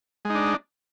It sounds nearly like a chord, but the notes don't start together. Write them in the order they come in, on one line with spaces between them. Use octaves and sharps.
G#3 D#4 D4